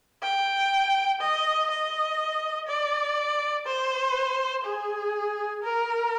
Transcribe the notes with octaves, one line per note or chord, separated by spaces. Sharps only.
G5
D#5
D#5
D5
C5
G#4
A#4